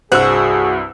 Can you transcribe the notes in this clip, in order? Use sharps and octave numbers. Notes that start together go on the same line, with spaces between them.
C2 G2 F#4 G#4 C5 E6